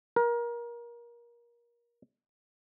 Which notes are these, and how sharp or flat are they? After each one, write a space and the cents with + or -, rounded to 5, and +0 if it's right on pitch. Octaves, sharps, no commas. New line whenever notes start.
A#4 +25